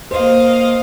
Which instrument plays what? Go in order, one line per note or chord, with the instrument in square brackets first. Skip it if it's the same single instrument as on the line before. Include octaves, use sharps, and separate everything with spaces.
[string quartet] A#3 D#5 F5 [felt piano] C5